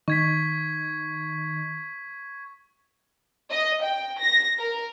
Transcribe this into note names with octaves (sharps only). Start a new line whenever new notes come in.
D#3 C#6 G#6 B6
D#5
G5
A#6
A#4